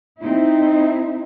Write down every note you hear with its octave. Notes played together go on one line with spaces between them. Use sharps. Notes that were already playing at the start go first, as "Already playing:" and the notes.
C4 D#4 E4